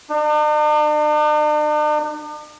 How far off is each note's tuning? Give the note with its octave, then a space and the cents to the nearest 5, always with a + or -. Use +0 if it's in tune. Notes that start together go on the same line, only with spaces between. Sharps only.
D4 +45